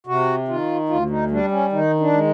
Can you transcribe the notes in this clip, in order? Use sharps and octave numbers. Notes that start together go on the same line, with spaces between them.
C3 F#4
D#3 F4
D2 F4
D#4
G3 D4
C#4
D#3 D#4
D4
G#3